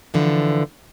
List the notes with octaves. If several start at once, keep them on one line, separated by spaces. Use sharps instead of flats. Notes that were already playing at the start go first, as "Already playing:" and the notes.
D3 E3 F3